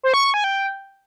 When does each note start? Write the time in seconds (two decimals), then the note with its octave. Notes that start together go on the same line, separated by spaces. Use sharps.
0.03 C5
0.14 C#6
0.24 C#6
0.34 G#5
0.44 G5